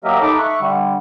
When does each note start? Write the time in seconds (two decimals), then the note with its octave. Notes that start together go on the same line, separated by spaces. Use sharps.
0.04 F#3 A#3 G4 A#4 D#5 E5
0.22 D#4 A4 B5 D6
0.39 E5 C#6 F#6
0.60 D3 G3